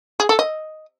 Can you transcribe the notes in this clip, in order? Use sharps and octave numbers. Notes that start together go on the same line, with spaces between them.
G#4
A4
D#5